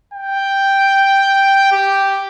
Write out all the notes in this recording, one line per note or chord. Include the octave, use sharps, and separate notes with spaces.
G5
G4